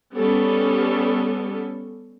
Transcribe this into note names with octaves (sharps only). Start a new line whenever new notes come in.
G3 B3 C#4 A4